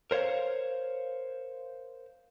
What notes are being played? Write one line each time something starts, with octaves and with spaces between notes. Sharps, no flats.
A#4 C5 C#5 F5